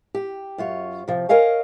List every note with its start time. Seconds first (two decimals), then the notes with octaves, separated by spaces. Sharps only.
0.15 G4
0.58 F#2 F4 C#5
1.08 C3 F3
1.29 A#4 C#5 D#5 F5 G#5